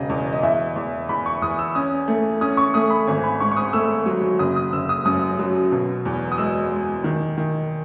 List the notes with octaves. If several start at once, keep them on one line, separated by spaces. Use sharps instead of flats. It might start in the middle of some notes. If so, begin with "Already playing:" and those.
Already playing: E1 C#3 D#5
E2
D#5
E2 E5
E2
E2 B5
C#6
E2 D#6
E6
C#4 D#6
A3
C#4 D#6
C#6
A3 D#6
B5
G#1 G#5
B5
G#2 C#6
C#6
D#6
A3 E6
F#3
F#1 D#6
D#6
F#1 E6
D#6
F#2 D#6
F#3
B2
E2
D#6
G#3 E6
G#3
D#3
D#3